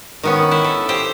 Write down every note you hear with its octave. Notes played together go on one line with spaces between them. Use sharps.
D#3 B3 C#4
E4
A4
G4 C5 G5